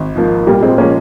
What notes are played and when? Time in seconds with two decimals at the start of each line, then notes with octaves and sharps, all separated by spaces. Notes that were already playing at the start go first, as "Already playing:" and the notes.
Already playing: G#1
0.15 G#2 F3 A#3
0.47 A#2 G3 A#3
0.62 G#3 C4
0.78 F3 G#3 A#3 C#4